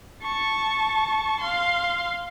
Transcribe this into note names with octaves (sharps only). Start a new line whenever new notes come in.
A5 C#6
F5 C6